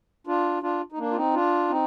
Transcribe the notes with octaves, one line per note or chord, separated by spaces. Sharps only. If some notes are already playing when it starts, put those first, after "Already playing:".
D4 F4
D4 F4
D#4
A#3 D4
F4
C4 D#4
D4 F4
C4 D#4